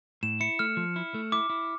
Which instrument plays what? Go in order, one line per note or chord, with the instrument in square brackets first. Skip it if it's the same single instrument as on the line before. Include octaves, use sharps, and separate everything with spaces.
[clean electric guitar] A2 [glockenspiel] E7
[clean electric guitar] E4 [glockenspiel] C#7
[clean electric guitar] A3 [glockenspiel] F6
[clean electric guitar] F3
E4
A3
[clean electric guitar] E4 [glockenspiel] D6
[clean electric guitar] E4